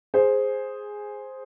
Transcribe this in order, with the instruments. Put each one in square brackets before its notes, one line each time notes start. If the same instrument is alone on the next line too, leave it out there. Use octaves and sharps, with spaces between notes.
[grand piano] G#4 C5